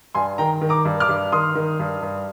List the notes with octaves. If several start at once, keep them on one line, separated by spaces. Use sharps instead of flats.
G2 G#5 C6
D#3 G5 A#5
D#3
A#5 D6
G2
D6 F6
G2
D#3 C6 D#6
D#3
G2
G2